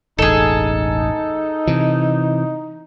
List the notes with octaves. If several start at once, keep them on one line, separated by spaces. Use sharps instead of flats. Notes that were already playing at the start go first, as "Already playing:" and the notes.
E1 A1 D#4 G#4 A4
C3 E3